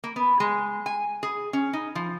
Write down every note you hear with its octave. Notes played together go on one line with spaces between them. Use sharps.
A#3
B3
G#3
G#5
G#4
C#4
D#4
F3